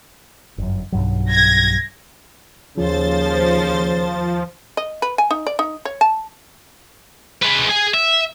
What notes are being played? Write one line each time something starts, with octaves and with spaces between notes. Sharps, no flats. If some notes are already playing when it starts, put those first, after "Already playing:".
G1 F#2
B1 G2 F#3
G#6 A#6
D#2 C#3 F3 C5 A6
D#5
B4
G#5
D#4
D5
D#4
C#5
A5
G#3 B4
G#4 G#5
E5